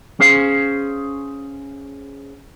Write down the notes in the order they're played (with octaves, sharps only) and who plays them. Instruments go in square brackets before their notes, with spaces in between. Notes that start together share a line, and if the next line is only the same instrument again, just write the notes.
[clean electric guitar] C#4 G#4 C5 F5